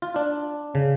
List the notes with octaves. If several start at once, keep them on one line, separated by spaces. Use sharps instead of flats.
F4
D4
C#3